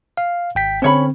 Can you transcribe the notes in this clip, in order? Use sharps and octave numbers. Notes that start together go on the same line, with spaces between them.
F5
G#1 G5 B6
D3 C4 C#4 C#5 B5